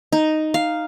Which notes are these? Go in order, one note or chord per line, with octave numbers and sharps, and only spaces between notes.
D#4
F5